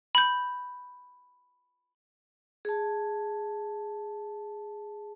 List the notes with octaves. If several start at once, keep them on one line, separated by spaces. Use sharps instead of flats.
B5 G6
G#4 A5